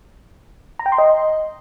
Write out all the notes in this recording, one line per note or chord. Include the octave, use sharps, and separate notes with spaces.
A#5
G5
C6
D#5